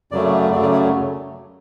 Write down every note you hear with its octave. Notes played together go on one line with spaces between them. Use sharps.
F#2 C#3 F#3 A3 D5
F#2 C#3 F#3 A3 D5
D5
C#5